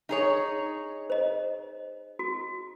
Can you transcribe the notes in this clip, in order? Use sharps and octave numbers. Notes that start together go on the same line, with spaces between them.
D#4 G#4 C#5
C5 D#5
F#4